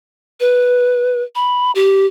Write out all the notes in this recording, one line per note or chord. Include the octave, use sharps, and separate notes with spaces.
B4
B5
G4